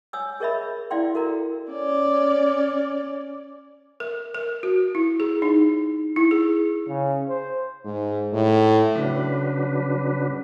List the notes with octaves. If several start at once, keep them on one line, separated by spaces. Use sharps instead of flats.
C#5 G#5 D#6 E6
G#4 A#4 C#5 D#5 E5 B5
E4 D5 F5 G5 C6
F#4 A4 A#4 A#5
C#4 D5
A#4
A#4
F#4
E4
G#4
D#4
E4
G#4
C#3
C5
G#2
A2
C#3 F#3 D4 B4